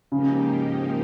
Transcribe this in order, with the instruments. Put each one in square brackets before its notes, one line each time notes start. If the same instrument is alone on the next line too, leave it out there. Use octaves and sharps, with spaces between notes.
[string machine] G#2 F3 A#3 D#4 G4 [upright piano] C#3